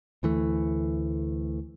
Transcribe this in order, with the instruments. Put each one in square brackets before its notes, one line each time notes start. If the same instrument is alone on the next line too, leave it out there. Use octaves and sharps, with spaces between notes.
[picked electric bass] D2 E3 A3